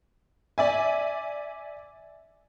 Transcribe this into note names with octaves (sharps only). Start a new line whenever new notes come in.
D5 E5 G#5